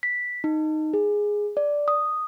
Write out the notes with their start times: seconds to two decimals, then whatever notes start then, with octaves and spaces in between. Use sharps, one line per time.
0.03 B6
0.44 D#4
0.93 G#4
1.57 D5
1.88 D#6